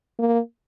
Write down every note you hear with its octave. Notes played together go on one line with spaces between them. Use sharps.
A#3